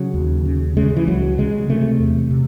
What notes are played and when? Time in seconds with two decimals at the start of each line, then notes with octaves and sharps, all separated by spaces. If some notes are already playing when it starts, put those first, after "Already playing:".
Already playing: C#3 F#3
0.14 D#2
0.45 C#3
0.77 C#3 G#3
0.96 E3
1.08 C#2 F#3
1.38 C#3 G#3
1.69 C3 A3
2.00 E2
2.31 C3